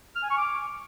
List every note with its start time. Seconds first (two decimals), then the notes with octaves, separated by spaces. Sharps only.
0.16 F6
0.23 G#5
0.30 C#6
0.38 D6